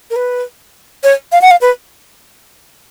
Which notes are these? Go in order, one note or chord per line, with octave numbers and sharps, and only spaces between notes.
A#4
B4
C#5
F5
F#5
F5
B4